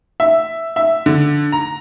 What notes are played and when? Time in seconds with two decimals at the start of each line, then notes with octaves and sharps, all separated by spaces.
0.20 E5
0.76 E5
1.06 D3
1.52 A#5